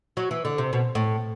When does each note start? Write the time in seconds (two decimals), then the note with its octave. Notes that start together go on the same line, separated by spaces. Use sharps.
0.17 F#3
0.31 E3
0.45 D3
0.58 C3
0.73 B2
0.95 A2